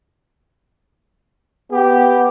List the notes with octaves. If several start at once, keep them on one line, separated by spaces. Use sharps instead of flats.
B3 G4